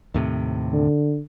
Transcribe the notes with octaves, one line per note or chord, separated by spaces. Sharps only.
D#2 A2 C3
D3